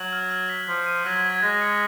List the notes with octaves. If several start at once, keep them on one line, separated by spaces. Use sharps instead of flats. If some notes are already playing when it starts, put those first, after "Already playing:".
Already playing: F#3 F#7
F6
F6
B6
F3 B6
D#7
F#3 F6
G#6
G#3 A#6
C#7